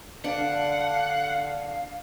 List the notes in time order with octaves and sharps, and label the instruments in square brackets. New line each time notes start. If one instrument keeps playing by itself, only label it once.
[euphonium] D3 [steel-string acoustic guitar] D4 [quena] F5 [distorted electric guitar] F#5